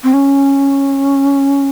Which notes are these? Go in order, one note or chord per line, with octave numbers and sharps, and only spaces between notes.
C4
C#4